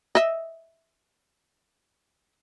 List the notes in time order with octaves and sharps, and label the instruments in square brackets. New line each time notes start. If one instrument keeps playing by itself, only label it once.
[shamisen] D#5 E5